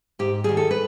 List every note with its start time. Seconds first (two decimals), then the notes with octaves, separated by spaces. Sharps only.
0.19 G#2 G4
0.44 D#3 G3 G#4
0.57 A4
0.71 B4